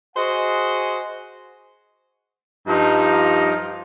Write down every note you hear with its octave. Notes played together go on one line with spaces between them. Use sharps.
F#4 G#4 C5 D#5 F#5 G#5
G2 F3 D#4